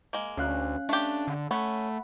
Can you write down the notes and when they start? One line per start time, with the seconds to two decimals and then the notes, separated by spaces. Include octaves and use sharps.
0.13 G#3 A#3
0.37 D2 C#4 F5 F#6
0.89 A3 D4 G4
1.28 D3
1.51 A3 C#4 F#5 B5